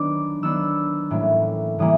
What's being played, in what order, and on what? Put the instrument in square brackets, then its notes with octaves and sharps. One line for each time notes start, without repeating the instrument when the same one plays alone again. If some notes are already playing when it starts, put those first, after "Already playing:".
Already playing: [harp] D#3 F#3 B3 D4 D6
D#3 F#3 B3 D4 E6
A2 E3 G3 A#3 C#4
A2 E3 G3 A#3 D#6